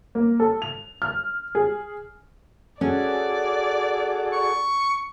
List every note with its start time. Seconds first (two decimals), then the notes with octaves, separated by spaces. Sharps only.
0.15 A#3
0.40 A4
0.62 F7
1.02 F6
1.55 G#4
2.81 C#4 F#4 G#4 A4 D5
4.33 C#6